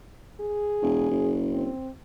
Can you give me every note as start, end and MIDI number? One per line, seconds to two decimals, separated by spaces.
0.40 1.35 68
0.82 1.07 28
1.11 1.69 30
1.53 1.90 60